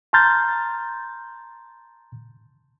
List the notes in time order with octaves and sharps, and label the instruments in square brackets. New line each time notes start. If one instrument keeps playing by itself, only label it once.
[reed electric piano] A5 A#5 C6 F6 G6 A6